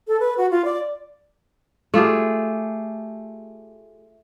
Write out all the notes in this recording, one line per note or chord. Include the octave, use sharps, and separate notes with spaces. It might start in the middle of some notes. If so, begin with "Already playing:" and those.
A4
B4
F#4
F4
D5
A3 F4 G4 G#4